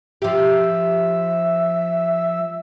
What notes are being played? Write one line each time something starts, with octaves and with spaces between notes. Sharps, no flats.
F3 G4 E5